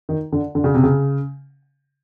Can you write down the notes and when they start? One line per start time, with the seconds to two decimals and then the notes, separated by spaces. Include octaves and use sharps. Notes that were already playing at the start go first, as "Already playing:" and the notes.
0.09 D#3
0.32 D3
0.55 D3
0.64 C#3
0.74 C3
0.83 C#3